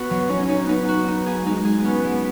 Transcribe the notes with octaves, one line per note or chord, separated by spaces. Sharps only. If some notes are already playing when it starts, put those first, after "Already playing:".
Already playing: B3 F#4
F#3
C#4 D#4
D#4
B3 D#4
F#4
B3 D#4
G#4
G#3 D#4
G#4
B3 C#4
G#3